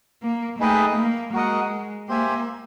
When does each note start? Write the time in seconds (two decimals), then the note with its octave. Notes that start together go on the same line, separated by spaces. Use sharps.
0.23 A#3
0.59 A3 D#4 G#4 B4 D#5 G5
0.97 A#3
1.34 G#3 F#4 A#4 D#5 F#5
2.08 A#3 G4 C5 E5 G#5